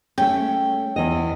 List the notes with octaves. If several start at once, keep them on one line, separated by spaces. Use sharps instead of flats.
A3 C#4 G5
E2 D#5